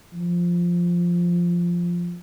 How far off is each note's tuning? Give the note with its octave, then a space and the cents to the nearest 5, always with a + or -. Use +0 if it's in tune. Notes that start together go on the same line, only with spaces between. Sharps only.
F3 -5